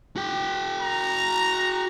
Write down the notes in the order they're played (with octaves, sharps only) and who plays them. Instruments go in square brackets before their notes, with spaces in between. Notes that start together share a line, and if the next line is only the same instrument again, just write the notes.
[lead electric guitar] F#4 G5
[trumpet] A#5